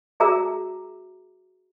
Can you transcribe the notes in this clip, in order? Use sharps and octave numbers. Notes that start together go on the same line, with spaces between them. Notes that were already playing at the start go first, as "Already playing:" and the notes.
F#4 G#4 E5 A#5 D6 E6